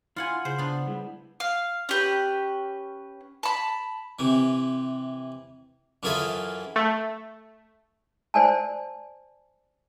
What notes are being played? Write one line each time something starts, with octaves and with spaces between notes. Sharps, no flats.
E4 F4 F#5 G#5
C#3 G#4 C5
B3 D4
G3 G#3 E4
F5
C#4 G4 B4
A5 B5
C3 E3
F#2 E3 F4 G#4 A4 B5
A3
C5 D5 G#5 A5